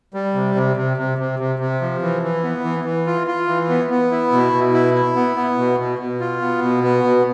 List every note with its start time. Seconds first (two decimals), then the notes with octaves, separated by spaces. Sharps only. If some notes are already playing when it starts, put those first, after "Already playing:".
0.14 G3
0.34 C3
0.55 C3
0.77 C3
0.97 C3
1.18 C3
1.39 C3
1.59 C3
1.81 F3
2.02 E3
2.22 E3
2.43 B3
2.64 E3
2.85 E3
3.06 F4
3.27 F4
3.48 E3
3.69 B3
3.90 B3
4.11 E4
4.32 B2
4.53 B2
4.74 E4
4.94 E4
5.16 B3
5.36 B3
5.58 B2
5.79 B2
5.99 B2
6.20 F4
6.41 B3
6.62 B2
6.84 B3
7.04 B2